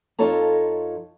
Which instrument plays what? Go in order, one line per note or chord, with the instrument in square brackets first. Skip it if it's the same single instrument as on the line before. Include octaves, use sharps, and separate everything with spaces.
[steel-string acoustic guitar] F2 D#4 F4 A4 C#5 A#5